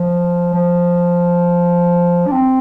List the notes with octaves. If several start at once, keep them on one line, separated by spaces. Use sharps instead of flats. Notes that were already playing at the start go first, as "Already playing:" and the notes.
Already playing: F3
F3
D4
C4